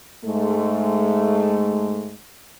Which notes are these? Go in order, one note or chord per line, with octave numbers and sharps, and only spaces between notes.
G#2 G#3 A3